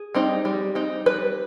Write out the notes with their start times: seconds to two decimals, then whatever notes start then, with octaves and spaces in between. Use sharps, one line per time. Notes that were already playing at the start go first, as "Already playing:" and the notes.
Already playing: G#4
0.15 G3 C4 D#4
0.45 G3
0.75 C4 D#4
1.06 G3 B4